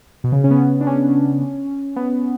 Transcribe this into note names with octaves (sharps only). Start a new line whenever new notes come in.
B2
C#3
C#4
B3
D4
C#4
B3